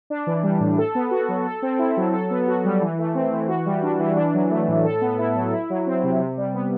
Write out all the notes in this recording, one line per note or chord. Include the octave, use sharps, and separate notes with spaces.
D4
E3
G3
A2
A4
B3
F#4
F#3
A4
C4
E4
F#3
A4
B3
F#4
G3
E3
A3
C4
E3
F#4
G3
D4
E3
D4
F#3
A3
A2
A4
B3
E4
F#3
E4
F#3
C4
C3
C3
G3
B3